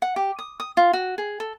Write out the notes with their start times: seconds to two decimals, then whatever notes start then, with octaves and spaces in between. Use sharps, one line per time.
0.02 F#5
0.16 G4
0.39 D#6
0.60 D#6
0.77 F4
0.93 F#4
1.18 G#4
1.40 A4